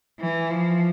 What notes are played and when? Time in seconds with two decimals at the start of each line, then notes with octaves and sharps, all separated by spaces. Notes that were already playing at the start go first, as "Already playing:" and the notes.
0.20 E3
0.51 F3